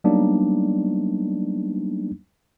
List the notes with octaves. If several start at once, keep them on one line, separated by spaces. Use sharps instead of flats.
F#3 G3 A#3 B3 D4 D#4